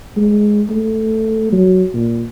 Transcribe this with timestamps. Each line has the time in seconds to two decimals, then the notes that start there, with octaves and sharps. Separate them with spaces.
0.16 G#3
0.70 A3
1.52 F#3
1.94 A#2